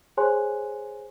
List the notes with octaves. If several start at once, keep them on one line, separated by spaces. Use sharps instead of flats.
G#4 C5 C#5 G#5 C6 F#6